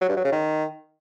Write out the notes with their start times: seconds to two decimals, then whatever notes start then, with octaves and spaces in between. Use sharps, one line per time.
0.01 F#3
0.09 G2
0.17 F#3
0.24 C#3
0.32 D#3